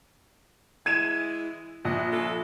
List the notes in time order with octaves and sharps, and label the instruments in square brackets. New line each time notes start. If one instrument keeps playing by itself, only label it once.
[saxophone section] E3 G#3 E4 [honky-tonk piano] G#6 D#7 E7
[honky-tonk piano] A#1 [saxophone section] G2 D#5 F#5
[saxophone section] C#4 F4 A4